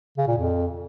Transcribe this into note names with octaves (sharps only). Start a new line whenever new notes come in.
C#3
A#2
F2